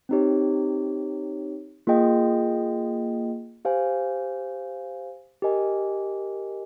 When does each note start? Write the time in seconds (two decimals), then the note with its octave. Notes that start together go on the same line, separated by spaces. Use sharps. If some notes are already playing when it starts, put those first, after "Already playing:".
0.09 C4 D#4 G4 C#5
1.87 A#3 F4 G#4 D#5 G5
3.65 G4 C5 F5 G#5
5.42 G4 A#4 D#5 G#5